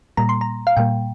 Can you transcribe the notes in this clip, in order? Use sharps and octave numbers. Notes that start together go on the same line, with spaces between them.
A#2 G3 A#3 A#5
C6
A#5
F5
A#2 G3 A#3 G5